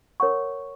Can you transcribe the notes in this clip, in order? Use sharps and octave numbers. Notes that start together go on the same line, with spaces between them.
A#4 C#5 F#5 C#6